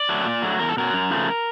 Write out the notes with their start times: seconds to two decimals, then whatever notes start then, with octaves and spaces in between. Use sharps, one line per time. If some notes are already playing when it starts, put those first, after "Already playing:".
Already playing: D5
0.09 F#3 A3
0.25 A#2
0.42 F#3 A3
0.59 E2 A#4
0.69 A4
0.77 B2 F#3 A#4
0.93 F#2
1.10 C#3 F3 A3